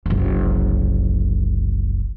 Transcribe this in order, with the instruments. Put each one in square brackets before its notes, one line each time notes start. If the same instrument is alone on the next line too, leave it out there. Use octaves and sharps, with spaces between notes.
[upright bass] F#1 C2